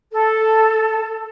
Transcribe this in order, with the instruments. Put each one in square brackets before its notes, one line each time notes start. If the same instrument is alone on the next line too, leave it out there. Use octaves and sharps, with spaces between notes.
[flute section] A4